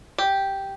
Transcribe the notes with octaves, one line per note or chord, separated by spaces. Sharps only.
G4